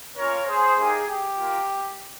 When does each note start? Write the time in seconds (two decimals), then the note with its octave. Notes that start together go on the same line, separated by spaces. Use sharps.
0.17 A#3 C#4 F4 A#4 C#5
0.47 G#4 C5
0.77 A#3 D#4 G4 G#4
1.07 G4
1.36 A#3 F4